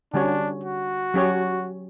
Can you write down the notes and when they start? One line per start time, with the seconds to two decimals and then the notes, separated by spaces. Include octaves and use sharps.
0.13 D3 G3 C#4 D4 F#4 C#5
0.64 F#4
1.14 F#3 C#4 G4 C#5